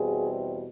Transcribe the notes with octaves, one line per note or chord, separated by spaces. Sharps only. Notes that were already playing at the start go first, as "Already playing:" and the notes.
Already playing: E2 B2 G3 C4 F#4 G#4